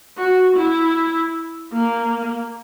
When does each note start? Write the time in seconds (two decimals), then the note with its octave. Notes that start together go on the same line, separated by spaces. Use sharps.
0.17 F#4
0.57 E4
1.73 A#3